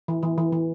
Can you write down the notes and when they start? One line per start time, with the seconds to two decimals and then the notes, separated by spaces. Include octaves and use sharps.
0.08 E3
0.23 E3
0.38 E3
0.52 E3